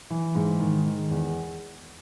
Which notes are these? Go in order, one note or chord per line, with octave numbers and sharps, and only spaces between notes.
E3
G#2
D#3
D#3
E2